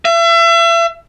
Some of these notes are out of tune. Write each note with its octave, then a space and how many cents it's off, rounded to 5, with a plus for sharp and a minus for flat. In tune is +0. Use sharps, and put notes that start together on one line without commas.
E5 +35